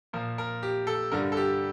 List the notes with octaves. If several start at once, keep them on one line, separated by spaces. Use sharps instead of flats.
A#2 F3 A#4
A#4
G4
A4
G2 D3 G3 A#4
A4
G4